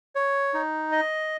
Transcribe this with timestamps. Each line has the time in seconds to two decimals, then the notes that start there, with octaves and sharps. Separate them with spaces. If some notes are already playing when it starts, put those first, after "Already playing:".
0.15 C#5
0.54 D#4
0.92 D#5